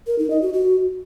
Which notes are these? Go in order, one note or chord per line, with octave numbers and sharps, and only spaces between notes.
A#4
D#4
D#5
F#4
F#4